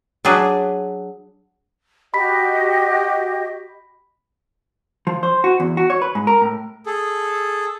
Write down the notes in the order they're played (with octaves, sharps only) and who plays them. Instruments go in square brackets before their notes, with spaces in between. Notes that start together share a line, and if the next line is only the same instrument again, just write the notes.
[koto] F#3 D4 G#4 B4
[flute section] F#4 G4 D#5 [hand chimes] B5 B6
[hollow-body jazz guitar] F3
C5
F#4
E2
F#4
C#5
B4
G#2
A#4
A2
[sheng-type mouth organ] G#4 A4